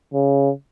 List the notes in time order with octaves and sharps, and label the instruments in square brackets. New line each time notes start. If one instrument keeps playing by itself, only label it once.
[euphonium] C#3